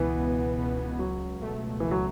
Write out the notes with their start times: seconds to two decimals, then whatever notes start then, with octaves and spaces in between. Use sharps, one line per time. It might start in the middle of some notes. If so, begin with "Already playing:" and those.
Already playing: C#2 B2 E3 B3
0.18 C#2
0.59 B2 B3
0.99 C#2 F#3
1.39 B2 A3
1.80 C#2 E3
1.91 F#3